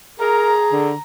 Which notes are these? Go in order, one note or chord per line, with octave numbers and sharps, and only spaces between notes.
G#4 A#4 A#5
D3